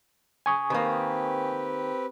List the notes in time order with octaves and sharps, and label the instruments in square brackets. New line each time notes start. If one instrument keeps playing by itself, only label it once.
[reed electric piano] G#5 C#6 D#6
[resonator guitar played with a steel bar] D#3 A#3 [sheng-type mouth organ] C4 G4 B4